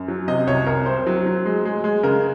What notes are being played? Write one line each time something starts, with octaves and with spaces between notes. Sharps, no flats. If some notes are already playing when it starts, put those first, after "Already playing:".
Already playing: F#2
F#3
C3 D#5
C2 C#5
C2 A#4
C4 C5
F#3
F#3
G#3
G#3
G#3
C#3 A#4